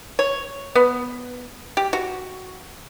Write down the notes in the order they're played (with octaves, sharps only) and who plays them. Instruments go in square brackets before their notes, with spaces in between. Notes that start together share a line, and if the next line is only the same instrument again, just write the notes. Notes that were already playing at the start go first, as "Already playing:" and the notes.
[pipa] C#5
B3
G4
F#4